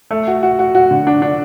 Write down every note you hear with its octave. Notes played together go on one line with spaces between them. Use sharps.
A3
F#4
F#4
F#4
F#4
D3
D4
D4